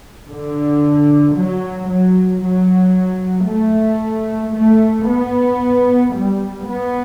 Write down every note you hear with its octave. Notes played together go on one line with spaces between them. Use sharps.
D3
F#3
F#3
F#3
A3
A3
B3
G3
B3